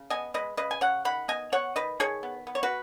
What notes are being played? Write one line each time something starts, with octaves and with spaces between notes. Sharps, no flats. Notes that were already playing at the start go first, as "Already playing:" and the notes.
Already playing: C#3
B3 D#5 G#5
G#3 B4 D#5
C#3 B4 D#5
G#5
C#3 C#5 F#5
D#3 F#5 B5
B3 D#5 G#5
B3 C#5 F#5
D#3 B4 D#5
D#3 G#4 C#5
B3
B3
C#5
F#4 B4